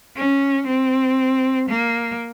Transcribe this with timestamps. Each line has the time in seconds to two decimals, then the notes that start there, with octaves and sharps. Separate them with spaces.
0.17 C#4
0.67 C4
1.69 A#3